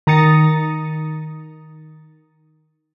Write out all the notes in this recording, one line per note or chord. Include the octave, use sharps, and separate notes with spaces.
D#3 A#5 D#6 A6 C#7